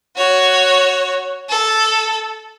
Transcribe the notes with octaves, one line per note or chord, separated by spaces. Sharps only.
F#4 C#5
A4